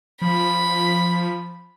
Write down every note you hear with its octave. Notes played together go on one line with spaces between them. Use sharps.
F3 B5